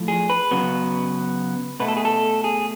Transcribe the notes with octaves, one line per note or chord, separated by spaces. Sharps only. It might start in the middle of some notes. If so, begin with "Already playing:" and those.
Already playing: A2 F3
G#4
B4
C#3 F#3 B3
B2 A3 B4
A4
G#4
A4
G#4